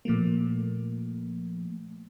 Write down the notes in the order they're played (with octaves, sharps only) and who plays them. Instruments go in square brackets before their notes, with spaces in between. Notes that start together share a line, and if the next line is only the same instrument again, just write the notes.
[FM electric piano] A#2 F3 A3 A#3